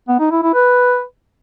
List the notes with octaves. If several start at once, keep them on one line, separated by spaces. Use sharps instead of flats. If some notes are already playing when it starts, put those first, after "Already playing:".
B3
D#4
E4
E4
B4